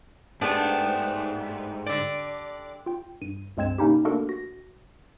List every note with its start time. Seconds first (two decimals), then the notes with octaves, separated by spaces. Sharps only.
0.41 G#2 A3 B3 D4 G4 E5 G5
1.86 D3 D5
2.86 F4 G5
3.21 G2 D#7
3.57 C#2 G2 G#3 C4 G#6 E7
3.78 C3 A#3 C#4 D#4 E4 G4
4.05 A3 A#3 D4 F#4 A4 A#4
4.29 F#4 A#6